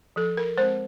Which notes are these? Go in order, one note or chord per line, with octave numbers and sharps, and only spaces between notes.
F3 A4
A#4
G#3 C4 C5